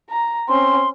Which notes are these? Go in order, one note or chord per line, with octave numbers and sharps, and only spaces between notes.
A#5
C4 C#4 C6